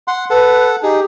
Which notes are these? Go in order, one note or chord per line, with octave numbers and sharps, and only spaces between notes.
F#5 C6
A4 B4 F#5
D#4 G4 G#4